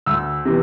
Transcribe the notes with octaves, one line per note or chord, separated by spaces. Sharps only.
D2 E6
C3 E3